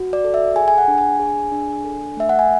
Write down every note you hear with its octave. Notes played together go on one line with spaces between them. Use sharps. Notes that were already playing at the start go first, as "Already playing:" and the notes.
Already playing: F#4
D5
A4
E5
G#4 G#5
G#5
F#5
D4
G#5
G#4
D4
A4
A3 E5
F#5
G#5